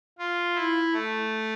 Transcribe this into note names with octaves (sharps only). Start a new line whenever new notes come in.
F4
E4
A3